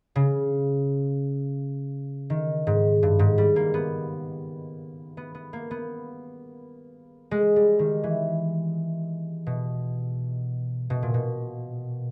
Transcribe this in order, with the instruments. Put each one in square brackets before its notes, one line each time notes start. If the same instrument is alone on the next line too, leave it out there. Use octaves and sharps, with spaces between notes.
[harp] C#3
D#3
G#2
G2
G#2
G3
A#3
B3
B3
B3
A#3
B3
G#3
G3
D#3
E3
B2
B2
A#2
B2